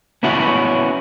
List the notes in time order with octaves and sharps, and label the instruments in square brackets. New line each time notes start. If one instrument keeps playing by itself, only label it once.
[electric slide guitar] B3 C#4 E4 F#4